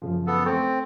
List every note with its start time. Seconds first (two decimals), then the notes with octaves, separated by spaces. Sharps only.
0.02 F#2 C#3 F3
0.27 B3 A4
0.46 A3 C4 C#6 G6